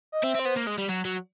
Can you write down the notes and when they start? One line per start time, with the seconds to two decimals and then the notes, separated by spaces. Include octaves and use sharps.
0.12 D#5
0.23 C4 E5
0.35 C4 C5
0.45 B3
0.56 A#3
0.66 G#3
0.78 G3
0.89 F#3
1.05 F#3